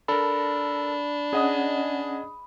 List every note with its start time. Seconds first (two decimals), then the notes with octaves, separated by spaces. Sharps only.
0.08 D4 A4 A#4 B5
1.33 C#4 G#4 D#5 F#5 D#6